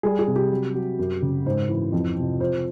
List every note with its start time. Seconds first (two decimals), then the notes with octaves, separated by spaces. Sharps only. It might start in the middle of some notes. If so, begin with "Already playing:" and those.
0.03 G3 G#4
0.19 G#4
0.28 C3
0.36 G4
0.51 F#3
0.75 F#3
0.99 F#2
1.22 C#3
1.46 G#2 C5
1.69 E3
1.92 F2
2.17 C3
2.40 F3 C5